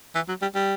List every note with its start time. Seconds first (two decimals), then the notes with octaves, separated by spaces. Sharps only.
0.15 E3
0.28 F#3
0.42 G3
0.55 G3